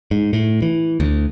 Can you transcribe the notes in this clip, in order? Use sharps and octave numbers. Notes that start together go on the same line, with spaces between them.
G#2
A2
E3
D2